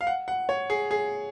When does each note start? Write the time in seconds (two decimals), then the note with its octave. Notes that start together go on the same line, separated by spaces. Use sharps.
0.01 F5
0.07 F#5
0.28 F#5
0.49 C#5
0.70 G#4
0.91 G#4